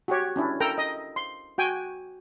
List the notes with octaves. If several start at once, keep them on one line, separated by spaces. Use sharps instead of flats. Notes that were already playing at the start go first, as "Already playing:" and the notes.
F#4 G4 C#5
C#4 D4 E4
A4 A#4 G5 A#5
D#5
C6
F#4 G5 G#5